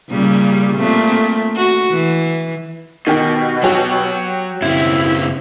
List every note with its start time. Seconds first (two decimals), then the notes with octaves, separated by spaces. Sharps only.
0.11 A#2 C#3 G3
0.76 A#2 A3 C4
1.56 F#4
1.91 E3
3.07 B2 D#3 G4
3.63 F#3 F#4 G4 C#5
4.62 F#2 C#3 C4 E4